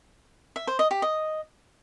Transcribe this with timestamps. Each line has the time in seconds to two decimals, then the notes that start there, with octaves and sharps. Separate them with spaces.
0.56 E5
0.67 C5
0.79 D#5
0.91 G4
1.02 D#5